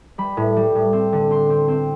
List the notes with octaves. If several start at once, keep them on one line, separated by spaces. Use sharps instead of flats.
G3 B5
A2
G3
A2
C4
D3
C4 C6
C4
C4